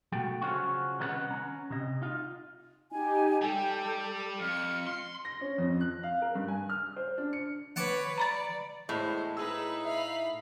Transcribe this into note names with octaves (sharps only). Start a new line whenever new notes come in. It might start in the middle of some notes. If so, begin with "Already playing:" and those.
B1 A3 F#4 G5
C#3 F3 F#3 C#4 F4 F#4
C2 D#3 D#4 F4 B4 F#5
C#4 A#5
C3 D#5
D#4 F4
D#4 G4 G#5
G3 A4 G5
F2 F6 C#7
C6
A#6
C#4
F2
F#6
F5
A#4
G2
G#5
F6
C5
D4
C#7
B4 C#5 F#5 A5 D6
D5 A#5 B5 A6
E2 A2 G#3 C5
D#4 E4 G#4 B4 E6
E5 F5 B5